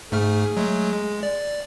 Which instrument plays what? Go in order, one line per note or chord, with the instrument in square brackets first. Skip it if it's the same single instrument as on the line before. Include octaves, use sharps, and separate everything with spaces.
[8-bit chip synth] G#2 A3 F6 [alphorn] G#4
[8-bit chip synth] F#3 G#3 A3
G#3
D5